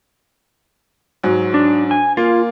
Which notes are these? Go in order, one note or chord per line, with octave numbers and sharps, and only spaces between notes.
G#2 F#3
D4
G#5
A#3 F4